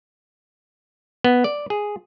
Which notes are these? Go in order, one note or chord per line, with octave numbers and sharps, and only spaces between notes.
B3
D5
G#4